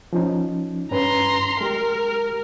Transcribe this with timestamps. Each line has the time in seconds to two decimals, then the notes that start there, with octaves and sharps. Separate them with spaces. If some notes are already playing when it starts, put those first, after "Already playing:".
0.13 F3 C#4 D#4
0.91 G2 C#4 B4 A#5 C6
1.61 G#3 G4 A#4